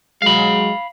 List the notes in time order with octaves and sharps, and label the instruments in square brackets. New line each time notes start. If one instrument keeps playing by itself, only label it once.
[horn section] F#3 G#3 [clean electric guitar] F5 B5